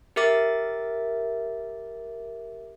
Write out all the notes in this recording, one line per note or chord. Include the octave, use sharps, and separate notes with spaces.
G4 A#4 E5 D6 A6